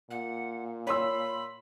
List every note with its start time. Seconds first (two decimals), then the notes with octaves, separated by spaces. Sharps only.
0.10 A#2 F#5
0.87 C#5 B5 C6 E6